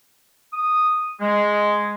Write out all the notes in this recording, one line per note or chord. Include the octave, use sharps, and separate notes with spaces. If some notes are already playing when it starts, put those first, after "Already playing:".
D#6
G#3